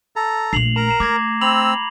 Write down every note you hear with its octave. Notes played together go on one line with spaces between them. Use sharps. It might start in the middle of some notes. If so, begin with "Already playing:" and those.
A4 A#5
A#1 A3 C7 F7 F#7
A#4 A#5
C7 E7
A3 D6 G#6 A#6
C4 B5 E6 F7 F#7